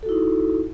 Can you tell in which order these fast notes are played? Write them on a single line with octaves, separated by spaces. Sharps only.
A4 F#4 E4 D#4